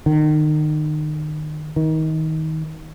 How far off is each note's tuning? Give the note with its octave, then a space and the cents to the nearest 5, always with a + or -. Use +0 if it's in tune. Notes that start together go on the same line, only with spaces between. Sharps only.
D#3 -30
D#3 +25